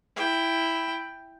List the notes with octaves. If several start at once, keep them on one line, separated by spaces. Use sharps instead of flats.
E4 G5